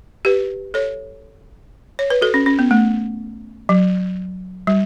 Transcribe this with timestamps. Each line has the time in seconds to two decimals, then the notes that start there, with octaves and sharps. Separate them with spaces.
0.25 G4 B4
0.74 A4 C#5
1.99 C#5
2.10 B4
2.21 F#4 A4
2.34 C#4
2.46 C#4
2.59 B3
2.71 A3
3.69 F#3
4.67 G3